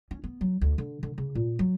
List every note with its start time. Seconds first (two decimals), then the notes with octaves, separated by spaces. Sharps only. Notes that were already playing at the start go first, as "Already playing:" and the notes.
0.11 C#4
0.24 B3
0.41 F#3
0.61 D2
0.78 D3
1.03 D3
1.18 C#3
1.35 A#2
1.59 F#3